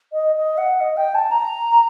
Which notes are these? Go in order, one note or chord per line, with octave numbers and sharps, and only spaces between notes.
D#5
D#5
F#5
D#5
G5
A5
A#5